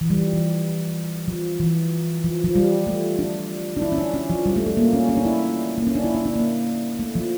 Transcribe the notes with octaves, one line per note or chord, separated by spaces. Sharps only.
E3
G3
F3
E3
F3
E3
F3
F3
G3
A3
D4
D4
E4
C#4
D4
C#4
F3
G3
A3
A3
A#3
C#4
C#4
D4
E4
A#3
C#4
D4
E4
D4
D4
A#3
A3
F3